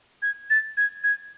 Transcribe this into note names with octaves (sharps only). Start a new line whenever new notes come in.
G#6
A6
G#6
G#6